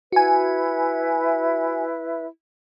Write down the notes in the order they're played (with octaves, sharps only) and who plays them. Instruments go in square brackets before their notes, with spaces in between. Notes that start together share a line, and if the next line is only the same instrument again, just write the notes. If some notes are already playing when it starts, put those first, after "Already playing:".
[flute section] E4 B4 E5 [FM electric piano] F#4 G#5